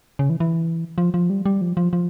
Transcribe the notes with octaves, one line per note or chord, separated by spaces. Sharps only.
C#3
E3
E3
F3
F3
G3
G3
F3
F3
F3